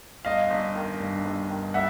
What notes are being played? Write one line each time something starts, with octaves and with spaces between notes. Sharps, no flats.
G1 D#5 F5
G1
D#3
G2
G1
D#3
G3 E5 F#5